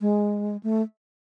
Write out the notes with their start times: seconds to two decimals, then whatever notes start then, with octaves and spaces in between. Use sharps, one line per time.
0.01 G#3
0.63 A3